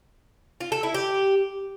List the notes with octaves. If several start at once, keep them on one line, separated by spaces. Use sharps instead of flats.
F4
A4
E4
G4